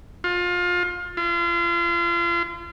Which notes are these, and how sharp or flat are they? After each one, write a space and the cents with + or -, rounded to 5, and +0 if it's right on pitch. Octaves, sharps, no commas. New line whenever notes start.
F4 +25
F4 -35